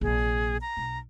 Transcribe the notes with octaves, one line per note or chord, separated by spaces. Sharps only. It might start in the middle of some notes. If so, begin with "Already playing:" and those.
A#1 C3 G#4
A#5
B1